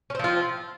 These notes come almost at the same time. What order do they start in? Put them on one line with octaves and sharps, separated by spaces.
C#4 C4 F3 F4